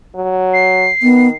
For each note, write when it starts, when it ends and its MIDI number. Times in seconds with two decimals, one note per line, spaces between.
0.15 0.89 54
0.53 1.35 96
1.03 1.34 51
1.03 1.28 59